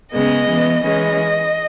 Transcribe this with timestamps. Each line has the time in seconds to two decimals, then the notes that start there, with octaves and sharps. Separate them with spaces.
0.13 C#3 G#3 B3 D#5
0.49 E3 B3
0.84 E3 G#3 C#4 D#5